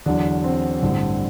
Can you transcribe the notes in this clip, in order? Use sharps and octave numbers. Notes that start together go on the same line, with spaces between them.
E2 D3 F#3 D4
C4
A1 G2 D3